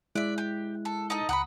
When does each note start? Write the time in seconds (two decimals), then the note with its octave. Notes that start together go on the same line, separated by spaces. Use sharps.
0.15 G#3 E4 D5 E5 F#6
0.38 G4
0.85 A4
1.10 D#4 A4 D#5
1.29 C#2 F#5 G5 A#5 B5 D#6